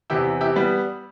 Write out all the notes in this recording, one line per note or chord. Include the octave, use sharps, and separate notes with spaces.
E2 C3 E3 E4 G4
E4 G4
G3 B3